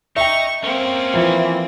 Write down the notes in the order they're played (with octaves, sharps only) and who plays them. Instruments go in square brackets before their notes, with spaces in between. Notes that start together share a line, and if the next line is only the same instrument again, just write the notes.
[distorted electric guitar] D#4 [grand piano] E5 G5 [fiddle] C#6
[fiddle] A#3 C4 [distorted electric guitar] C#4 A#4
[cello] E3 [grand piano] F3